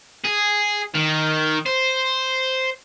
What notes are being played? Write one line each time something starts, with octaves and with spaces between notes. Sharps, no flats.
G#4
D#3
C5